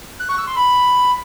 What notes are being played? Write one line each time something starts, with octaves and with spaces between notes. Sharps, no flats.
F#6
C#6
E6
C6
B5